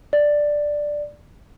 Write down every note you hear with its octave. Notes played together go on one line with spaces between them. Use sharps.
D5